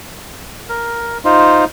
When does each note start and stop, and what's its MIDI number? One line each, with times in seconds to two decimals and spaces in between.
0.69 1.18 70
1.25 1.65 63
1.25 1.65 65
1.25 1.65 72